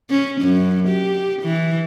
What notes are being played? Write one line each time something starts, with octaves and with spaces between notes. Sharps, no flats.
C#4
F#2
G4
E3